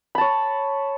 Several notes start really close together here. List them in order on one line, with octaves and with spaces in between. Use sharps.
B5 A5 C#5